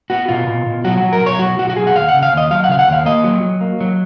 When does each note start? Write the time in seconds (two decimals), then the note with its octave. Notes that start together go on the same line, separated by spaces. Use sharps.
0.10 B3 F#4
0.28 B2 F4
0.47 B2
0.66 B2
0.84 F#3 F#4
0.98 F#4
1.03 F#3
1.13 A#4
1.21 B1
1.26 C#5
1.39 B1 F#4
1.58 B1 F#4
1.70 F#4
1.76 B1 G#4
1.87 F#5
1.95 D#2 F5
2.08 F#5
2.14 C#3
2.23 F5
2.32 D#2
2.37 D#5
2.51 F#3 F5
2.64 F#5
2.68 C#3 F5
2.79 F#5
2.87 D#2
2.92 F5
3.05 A#3 D#5
3.24 F#3
3.43 F#3
3.61 A#3
3.81 F#3